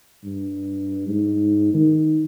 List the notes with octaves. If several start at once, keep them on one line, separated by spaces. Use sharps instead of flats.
G2
G#2
D#3